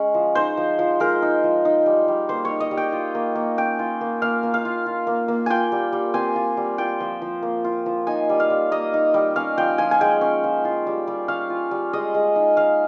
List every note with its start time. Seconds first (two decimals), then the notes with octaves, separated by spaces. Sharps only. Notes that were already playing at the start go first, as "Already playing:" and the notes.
Already playing: G#3 C#4
0.14 F3
0.35 D#4 C5
0.57 F3
0.79 F3
1.00 G#3 A#4
1.22 D#4
1.43 F3
1.65 D#4
1.86 G3
2.08 G3
2.29 A#3 C5
2.45 C#5
2.51 D#4
2.60 D#5
2.71 G3
2.77 G5
2.93 F4
3.15 A#3
3.35 A#3
3.58 C#4 G5
3.79 F4
4.01 A#3
4.22 A#3 F5
4.43 A#3
4.54 F5
4.65 F4
4.86 F4
5.07 A#3
5.28 A#3
5.46 F4 G5 G#5
5.72 G3
5.93 G3
6.14 C4 G#5
6.36 F4
6.57 G3
6.78 F4 G5
7.00 F3
7.22 F3
7.43 A#3
7.64 F4
7.86 F3
8.07 D#4 G#5
8.29 G3
8.40 F5
8.50 G3
8.71 A#3 D#5
8.94 D#4
9.14 G3
9.36 C#4 F5
9.57 F3 G5
9.78 F3 G#5
9.91 G#5
10.01 G#3 G5
10.21 C#4
10.44 F3
10.65 F4
10.87 G3
11.07 G3
11.28 C#4 F5
11.50 F4
11.71 G3
11.93 G#3 D#5
12.14 G#3
12.36 D#4
12.57 D#4 F5